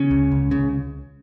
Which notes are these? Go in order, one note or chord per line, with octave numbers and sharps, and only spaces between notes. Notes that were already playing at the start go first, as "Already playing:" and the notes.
Already playing: C#3 C#4
C#2
C#2
C#3